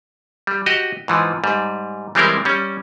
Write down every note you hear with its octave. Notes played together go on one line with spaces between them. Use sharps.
G3
F#4 G4 D#5
G#2 E3 F3
G#2 G3
E3 G3 G#3 C4 E4 A#4
G3 C#4